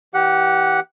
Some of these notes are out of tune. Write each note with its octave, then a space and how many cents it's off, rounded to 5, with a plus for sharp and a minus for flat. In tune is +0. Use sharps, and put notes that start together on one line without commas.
E3 -20 G4 -20 F#5 +0